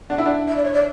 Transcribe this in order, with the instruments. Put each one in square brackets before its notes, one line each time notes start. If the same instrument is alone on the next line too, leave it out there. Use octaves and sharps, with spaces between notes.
[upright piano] D4 [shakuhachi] F#5
[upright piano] E4
D4
[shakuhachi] E5
D5
C#5
D5